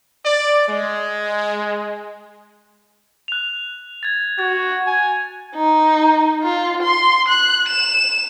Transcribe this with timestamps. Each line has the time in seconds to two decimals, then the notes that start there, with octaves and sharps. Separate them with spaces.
0.24 D5
0.68 G#3
3.28 F#6 F7
4.03 G#6 A6
4.39 F#4 G#6 A6
4.87 G#5
5.55 D#4
6.43 F4
6.83 C6
7.28 F#6
7.69 E7